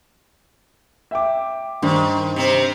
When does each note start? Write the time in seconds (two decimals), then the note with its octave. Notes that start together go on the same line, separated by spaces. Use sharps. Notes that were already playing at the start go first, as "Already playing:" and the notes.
1.11 E5 G5 D6
1.82 G2 D#3 C5
2.36 C3 C4